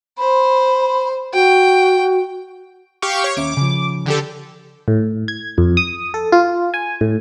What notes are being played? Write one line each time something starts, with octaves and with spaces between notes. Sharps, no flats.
C5 B5
F#4 G5
G4 F5 C#6
C#5
D#2 C#4 E5 D6
C#3 F3
D3 G4 A4
A2
G#6
F2
D#6
A4
F4
G#5
A2